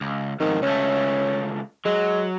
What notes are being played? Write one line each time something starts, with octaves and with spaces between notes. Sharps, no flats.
C#2
F2 G#2 D#3
C#2 A3 C#4
F#3 G#3